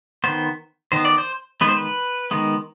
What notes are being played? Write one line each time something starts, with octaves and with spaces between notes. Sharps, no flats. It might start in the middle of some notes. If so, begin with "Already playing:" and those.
D#3 B3 C5
D#3 B3 C5
D5
C5
D#3 G#3 B3 B4
C5
B4
D#3 G#3 B3